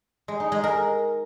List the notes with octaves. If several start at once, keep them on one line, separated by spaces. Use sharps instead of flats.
G#3
D#4
G#3
A#4